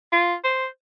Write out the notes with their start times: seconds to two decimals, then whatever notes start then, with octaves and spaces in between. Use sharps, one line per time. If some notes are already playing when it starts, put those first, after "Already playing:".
0.12 F4
0.44 C5